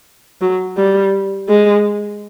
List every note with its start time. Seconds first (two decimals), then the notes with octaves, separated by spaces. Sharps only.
0.41 F#3
0.77 G3
1.48 G#3